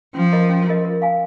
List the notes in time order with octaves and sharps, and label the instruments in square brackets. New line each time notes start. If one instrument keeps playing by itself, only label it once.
[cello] F3 [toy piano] C#4
[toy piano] F4 A#4 D#5
C#4
F4 A#4 D#5
A#4
F5 G#5